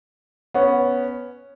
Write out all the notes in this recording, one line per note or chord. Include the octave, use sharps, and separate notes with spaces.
B3 C#4